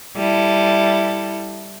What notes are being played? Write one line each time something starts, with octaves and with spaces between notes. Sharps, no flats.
G3 E4 A4